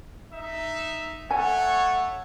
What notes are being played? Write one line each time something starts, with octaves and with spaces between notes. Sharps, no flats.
D#4 E5
A3 A4 C#5 F#5 G#5